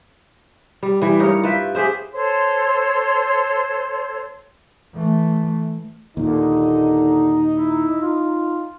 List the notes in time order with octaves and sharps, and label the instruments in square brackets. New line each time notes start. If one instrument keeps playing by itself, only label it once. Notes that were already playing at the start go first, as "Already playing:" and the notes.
[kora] G3
E3 G3
G2 D#4 A#4 C#5
F4 B4 E5 G5
G4 G#4 C5 E5
[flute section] A4 C5 C#5 C6
[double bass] E3 A3
[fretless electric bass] D#2 A#2 [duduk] D3 [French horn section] D#4
[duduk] E4
F4